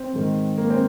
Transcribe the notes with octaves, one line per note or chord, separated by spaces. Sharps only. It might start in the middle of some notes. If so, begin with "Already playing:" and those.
Already playing: C4
G#2 D#3
A#3
C4